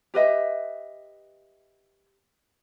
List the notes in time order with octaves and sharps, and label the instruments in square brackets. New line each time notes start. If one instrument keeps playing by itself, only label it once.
[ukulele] G4 B4 D#5 E5